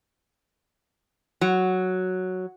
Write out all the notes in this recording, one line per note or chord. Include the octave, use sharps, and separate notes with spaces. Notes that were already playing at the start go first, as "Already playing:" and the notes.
F#3